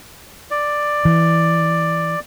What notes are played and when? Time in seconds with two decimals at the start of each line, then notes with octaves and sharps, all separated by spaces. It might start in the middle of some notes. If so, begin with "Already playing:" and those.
0.51 D5
1.05 E3